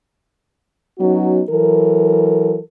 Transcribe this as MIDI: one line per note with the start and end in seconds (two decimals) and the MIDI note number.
0.99 1.42 54
0.99 1.42 59
0.99 1.42 61
0.99 1.42 63
0.99 1.42 66
1.50 2.59 52
1.50 2.59 54
1.50 2.59 69
1.50 2.59 70